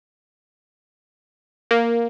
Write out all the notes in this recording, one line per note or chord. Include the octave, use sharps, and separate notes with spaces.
A#3